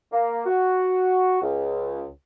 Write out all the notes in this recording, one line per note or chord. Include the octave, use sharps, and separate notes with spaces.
A#3
F#4
C#2